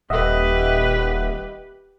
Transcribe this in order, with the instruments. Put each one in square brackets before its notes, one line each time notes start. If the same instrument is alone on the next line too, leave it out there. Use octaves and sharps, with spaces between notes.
[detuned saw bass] D#1 [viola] G4 B4 [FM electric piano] D#5 E5 F#5